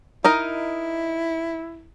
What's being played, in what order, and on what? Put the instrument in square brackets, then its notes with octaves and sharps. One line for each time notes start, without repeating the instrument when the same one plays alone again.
[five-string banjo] D#4 A#4 D#5 [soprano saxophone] E4